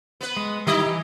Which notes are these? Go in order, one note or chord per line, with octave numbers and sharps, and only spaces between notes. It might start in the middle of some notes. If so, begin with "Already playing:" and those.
B3 B4
G#3
D#3 G3 D#4 E4 G4 D#5
E3